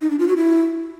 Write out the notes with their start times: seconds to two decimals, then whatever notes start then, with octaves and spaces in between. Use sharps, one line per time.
0.02 D#4
0.10 D4
0.19 F4
0.28 F#4
0.37 E4